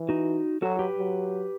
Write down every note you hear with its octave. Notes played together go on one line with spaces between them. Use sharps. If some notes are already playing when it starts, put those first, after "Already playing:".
Already playing: E3
D#4 F#4
F#3 F#4 A4
G4 B4
F#3